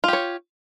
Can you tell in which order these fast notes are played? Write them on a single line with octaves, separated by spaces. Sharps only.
F4 G4 C#5